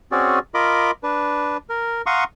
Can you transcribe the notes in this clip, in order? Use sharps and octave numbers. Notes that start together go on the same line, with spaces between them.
C4 C#4 F#4 G#4 D5
F4 A#4 D#5 B5 D6
D4 B4
A#4
F5 F#5 A#5 C6 C#6 D#6